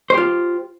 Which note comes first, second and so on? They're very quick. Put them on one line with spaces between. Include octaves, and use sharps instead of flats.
C5 G4 F4